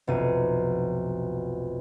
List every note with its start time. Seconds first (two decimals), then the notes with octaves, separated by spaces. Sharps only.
0.07 F1 B1 D#7